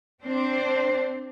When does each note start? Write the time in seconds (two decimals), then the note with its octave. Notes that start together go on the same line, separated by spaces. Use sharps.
0.22 C4 D4 C5